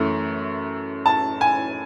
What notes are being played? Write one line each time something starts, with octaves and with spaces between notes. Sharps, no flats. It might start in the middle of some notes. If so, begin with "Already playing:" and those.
Already playing: F#2 E3 A3
A5
G#5